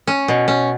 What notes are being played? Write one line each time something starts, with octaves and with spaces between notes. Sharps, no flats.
C#4
B2
C#4